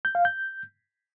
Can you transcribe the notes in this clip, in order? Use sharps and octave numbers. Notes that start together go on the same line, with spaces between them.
G6
F5
G6